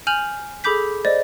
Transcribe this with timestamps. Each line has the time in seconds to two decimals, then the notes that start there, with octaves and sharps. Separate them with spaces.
0.07 G#5 F6 G6 F7 F#7
0.64 G#4 A4 B5 D6 G6 B6
1.05 C5 D5 D#5